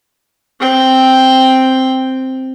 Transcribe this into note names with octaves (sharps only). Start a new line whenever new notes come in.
C4 G5